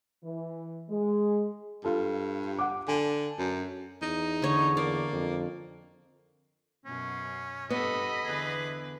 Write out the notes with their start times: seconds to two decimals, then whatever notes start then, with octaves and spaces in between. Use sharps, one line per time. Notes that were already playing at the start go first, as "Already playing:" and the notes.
0.24 E3
0.90 G#3
1.85 G2 F4 A4
2.59 F#5 D6
2.88 D3 G#5 A5
3.38 F#2
4.02 E2 D#4
4.42 D3 C#5
4.77 A#3 D5
5.13 F2
6.85 F#2 B2 C#4
7.70 G2 B3 A4 D#5 B5
8.24 E2 D3 G#4 B4